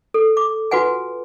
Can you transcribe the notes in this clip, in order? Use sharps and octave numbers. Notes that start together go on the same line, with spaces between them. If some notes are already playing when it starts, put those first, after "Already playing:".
A4
D6
F4 F#4 B4 F#5 G#5